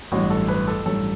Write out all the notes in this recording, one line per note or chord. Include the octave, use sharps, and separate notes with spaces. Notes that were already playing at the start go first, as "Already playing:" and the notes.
A1 G2 F#3 F#4
A4
B4
A4
A1 G2 F#3 A4